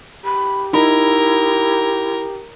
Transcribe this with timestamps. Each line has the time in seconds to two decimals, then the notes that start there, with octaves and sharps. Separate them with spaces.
0.25 G4 B5
0.73 D#4 E4 A#4 B5